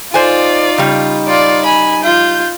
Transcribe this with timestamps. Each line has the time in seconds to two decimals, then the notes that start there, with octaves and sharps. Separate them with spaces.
0.14 D#4 F4 C5 D5 G#5
0.78 C#3 G3
1.28 F4 D5
1.65 G#5 B5
2.04 F4 G6